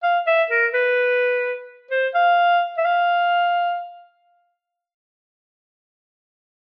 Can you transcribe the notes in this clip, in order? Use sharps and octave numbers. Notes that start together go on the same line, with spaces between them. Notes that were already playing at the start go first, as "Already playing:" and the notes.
F5
E5
A#4
B4
C5
F5
E5
F5